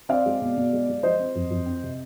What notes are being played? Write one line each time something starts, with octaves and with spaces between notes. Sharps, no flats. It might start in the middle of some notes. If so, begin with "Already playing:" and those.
C4 D5 F5
G#3
B2
B2
G#3
G#3
F3 C5 D#5
C4
F2
F2
C4
C3